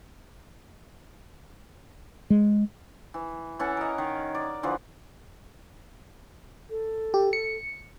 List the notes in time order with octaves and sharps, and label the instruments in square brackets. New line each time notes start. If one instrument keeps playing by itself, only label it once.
[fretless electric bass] G#3
[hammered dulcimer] E3
E3 C#4 A4 F#5
A#4 D#5
D#3
D5
D3 E3 F3
[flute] A4
[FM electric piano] G4
C#7